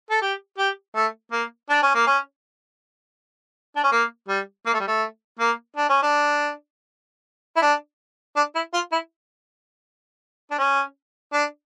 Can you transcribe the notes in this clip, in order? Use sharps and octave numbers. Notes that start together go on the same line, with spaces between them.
A4
G4
G4
A3
A#3
D4
C#4
A#3
C#4
D4
C#4
A#3
G3
A#3
A3
G3
A3
A#3
D4
C#4
D4
E4
D4
D4
E4
F4
E4
D4
C#4
D4